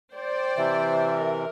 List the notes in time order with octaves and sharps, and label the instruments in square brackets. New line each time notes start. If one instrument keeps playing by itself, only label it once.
[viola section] C5 D5 G5
[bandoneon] C3 E3 [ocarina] E5
[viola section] A#4